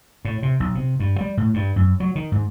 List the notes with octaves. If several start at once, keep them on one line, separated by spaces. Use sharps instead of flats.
A2
C3
B1
C3
G2
G3
A2
G2
F#2
F#3
D#3
G#2